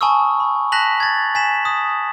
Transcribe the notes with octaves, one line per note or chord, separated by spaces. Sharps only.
G#5 A5 B5 C#6 D#6 E6
B5
A5 F#6 A#6 B6 F7 F#7
G#6 A6
G#5 B6 E7 F#7
D#6